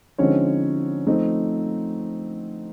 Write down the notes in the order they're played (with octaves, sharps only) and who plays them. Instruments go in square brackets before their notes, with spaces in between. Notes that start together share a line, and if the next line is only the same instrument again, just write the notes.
[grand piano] D3 F3 G#3 C4 C#4 D#4 C#5
F3 A3 C4 D#4